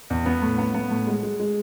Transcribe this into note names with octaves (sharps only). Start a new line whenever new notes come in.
E2
B3
A2
B3
B3
A2
G#3
G#3
G#3